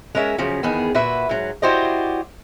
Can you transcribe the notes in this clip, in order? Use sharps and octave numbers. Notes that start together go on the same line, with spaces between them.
G#3 C#4 A#4 C#5 E5
C#3 F3 F#3 C#4
E2 D#3 B3 G#4
A#2 F#4 B4 E5
G#2 F#3
E4 F#4 G4 C5 D5 D#5